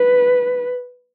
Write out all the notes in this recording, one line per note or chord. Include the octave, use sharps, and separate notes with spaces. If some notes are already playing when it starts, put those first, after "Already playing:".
Already playing: B4